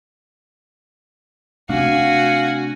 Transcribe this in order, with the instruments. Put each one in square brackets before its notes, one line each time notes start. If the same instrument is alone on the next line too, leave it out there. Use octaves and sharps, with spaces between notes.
[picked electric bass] C3 A3 D4 [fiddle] F#4 G#5 [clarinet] F5